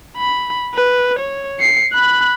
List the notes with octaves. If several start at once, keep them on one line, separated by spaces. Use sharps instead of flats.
B5
B4
C#5
C7 C#7
B5 F#6